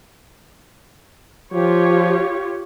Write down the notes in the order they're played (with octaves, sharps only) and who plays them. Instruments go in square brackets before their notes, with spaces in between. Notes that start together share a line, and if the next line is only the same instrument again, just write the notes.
[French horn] F3 [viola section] F4 G4 C#5